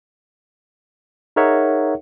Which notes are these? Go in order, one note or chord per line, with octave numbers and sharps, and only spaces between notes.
D#4 G#4 A#4 C#5 E5 F#5